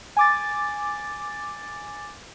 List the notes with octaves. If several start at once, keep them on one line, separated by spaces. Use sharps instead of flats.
G#5 D6 A6